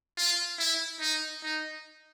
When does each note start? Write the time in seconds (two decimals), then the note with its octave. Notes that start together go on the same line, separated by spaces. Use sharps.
0.18 F4
0.60 E4
1.01 D#4
1.43 D#4